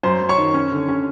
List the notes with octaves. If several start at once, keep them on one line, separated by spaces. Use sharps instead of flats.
F#2 C5 C6
F#2
C#5 C#6
D#3
C#4
D3
C#4